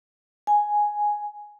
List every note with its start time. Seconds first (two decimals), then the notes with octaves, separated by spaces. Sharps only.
0.47 G#5